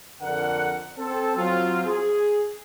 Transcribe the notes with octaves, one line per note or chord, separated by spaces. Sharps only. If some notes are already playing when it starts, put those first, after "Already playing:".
F2 D3 A#4 D5 F#5
C4 A4
F#3 C4 F4
G#4